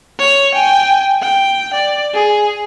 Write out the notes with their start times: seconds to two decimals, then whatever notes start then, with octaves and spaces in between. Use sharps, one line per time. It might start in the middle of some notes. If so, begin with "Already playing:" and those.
0.19 C#5
0.55 G5 G#5
1.21 G5
1.74 D5
2.14 G#4